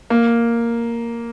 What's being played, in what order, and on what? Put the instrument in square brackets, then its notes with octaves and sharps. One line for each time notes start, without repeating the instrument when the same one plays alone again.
[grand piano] A#3